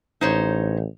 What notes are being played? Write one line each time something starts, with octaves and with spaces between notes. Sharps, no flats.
A1 D#4 C5 C#5